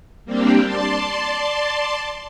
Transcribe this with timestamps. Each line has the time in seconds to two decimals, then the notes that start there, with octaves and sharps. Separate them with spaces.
0.25 G3 A#3 C4 D4 G4
0.65 D5 A5 C6